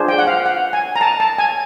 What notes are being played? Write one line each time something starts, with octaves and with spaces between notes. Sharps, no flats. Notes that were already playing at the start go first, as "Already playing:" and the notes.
Already playing: D4 F4 G#4 C5
G5
F#5
F5
F#5
G#5
A#5
A5
A5
G#5